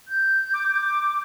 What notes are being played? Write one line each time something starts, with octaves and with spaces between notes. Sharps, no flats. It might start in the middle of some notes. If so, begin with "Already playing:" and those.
G6
D6